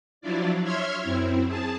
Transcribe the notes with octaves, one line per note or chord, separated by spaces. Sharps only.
F3 F#3 D4 E4 F4 D5
C#5 E5 C6 F6 G#6
F#2 C4 E4
G#4 A5